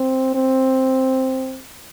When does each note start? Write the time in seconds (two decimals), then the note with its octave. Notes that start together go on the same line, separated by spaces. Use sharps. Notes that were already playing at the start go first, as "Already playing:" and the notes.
Already playing: C4
0.35 C4